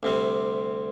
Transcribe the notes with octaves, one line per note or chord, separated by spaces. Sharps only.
D2 C3 G3 C4